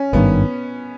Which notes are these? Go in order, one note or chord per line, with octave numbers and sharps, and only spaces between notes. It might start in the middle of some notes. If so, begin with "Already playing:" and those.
Already playing: C#4
G#1 G2 D#3 B3